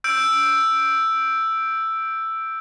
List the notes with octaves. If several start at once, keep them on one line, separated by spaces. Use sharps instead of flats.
E6 G6 D7